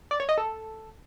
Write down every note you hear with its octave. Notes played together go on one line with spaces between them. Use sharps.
D5
C#5
D#5
A4